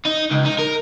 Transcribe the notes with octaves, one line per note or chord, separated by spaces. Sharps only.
D#4
C#2
D#4
A#4